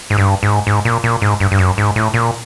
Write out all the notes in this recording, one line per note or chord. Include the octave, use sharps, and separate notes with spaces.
G#2
G2
G#2
G#2
A#2
A#2
G#2
G2
G2
F#2
G#2
A2
A#2